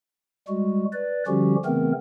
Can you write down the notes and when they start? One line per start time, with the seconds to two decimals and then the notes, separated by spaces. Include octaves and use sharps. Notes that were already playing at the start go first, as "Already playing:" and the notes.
0.48 G3 G#3 F#4
0.93 B4 D5
1.27 D3 F3 G3 C#4 F#4 G4
1.65 C#3 E3 A3 B3 C4 A#4